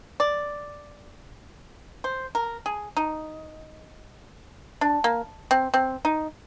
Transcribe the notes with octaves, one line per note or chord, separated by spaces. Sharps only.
D5
C5
A#4
G#4
D#4
D4
A#3
C4
C4
D#4